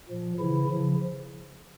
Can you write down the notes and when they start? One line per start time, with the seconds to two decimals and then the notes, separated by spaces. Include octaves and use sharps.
0.09 A#2 F3
0.39 C#3 E3 E4
0.71 C#3 F3